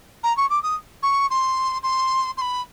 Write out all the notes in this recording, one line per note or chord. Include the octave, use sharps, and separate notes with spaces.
A#5
C#6
D6
D#6
C#6
C6
C6
C6
B5